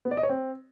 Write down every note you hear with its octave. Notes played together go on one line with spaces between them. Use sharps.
B3
D5
D#5
C#5
C4